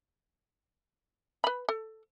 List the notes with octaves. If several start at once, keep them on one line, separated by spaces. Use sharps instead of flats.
B4 B5
A4